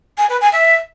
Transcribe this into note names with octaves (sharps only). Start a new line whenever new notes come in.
G#5
B4
G#5
E5